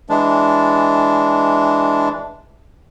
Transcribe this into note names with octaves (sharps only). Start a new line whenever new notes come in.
E3 G#3 D4